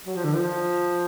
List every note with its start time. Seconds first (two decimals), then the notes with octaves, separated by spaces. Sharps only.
0.07 F#3
0.16 F3
0.25 D3
0.35 F3